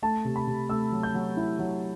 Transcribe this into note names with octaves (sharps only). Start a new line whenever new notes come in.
A3 A5
C3
B5
C3
A3 E6
F#3
G6
F#3
E4
F#3